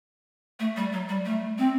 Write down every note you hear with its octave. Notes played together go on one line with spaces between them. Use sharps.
A3
G3
F#3
G3
A3
C4